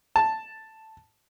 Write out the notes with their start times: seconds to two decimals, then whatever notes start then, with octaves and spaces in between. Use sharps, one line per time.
0.16 A5